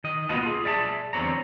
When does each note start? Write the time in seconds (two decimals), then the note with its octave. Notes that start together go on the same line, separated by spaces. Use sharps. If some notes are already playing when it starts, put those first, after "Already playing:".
0.04 D#3 D#5
0.29 A#3 B3 F4 F#4 D#5 A5
0.43 F4 G#4
0.64 G#4 D5 E5 G5 A5
1.13 E2 D3 C4 C#5 A#5